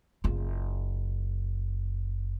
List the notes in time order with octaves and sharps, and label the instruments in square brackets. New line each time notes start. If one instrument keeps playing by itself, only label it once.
[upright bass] F#1 F4